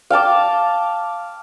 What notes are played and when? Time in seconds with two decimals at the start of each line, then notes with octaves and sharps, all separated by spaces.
0.10 F5 G5 A5 D6